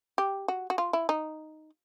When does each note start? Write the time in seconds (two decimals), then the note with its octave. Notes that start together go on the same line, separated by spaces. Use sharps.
0.18 G4
0.48 F#4
0.70 F#4
0.78 F4
0.93 E4
1.09 D#4